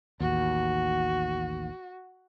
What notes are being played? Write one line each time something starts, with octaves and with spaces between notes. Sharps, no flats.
A1 D#2 F#4